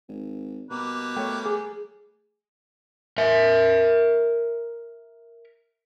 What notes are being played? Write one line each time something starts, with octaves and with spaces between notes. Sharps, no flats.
G#1
B2 G3 A#3 B4
A3 C#5 G5
G#4
A#4 E5